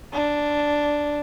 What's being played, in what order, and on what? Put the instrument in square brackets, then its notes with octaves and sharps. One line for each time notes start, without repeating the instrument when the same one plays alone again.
[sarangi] D4